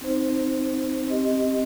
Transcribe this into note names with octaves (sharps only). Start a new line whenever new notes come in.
C4 D#4 C5
C4 G4 D#5